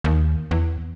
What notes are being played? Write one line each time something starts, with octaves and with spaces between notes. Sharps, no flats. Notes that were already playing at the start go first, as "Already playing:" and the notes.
D#2
E2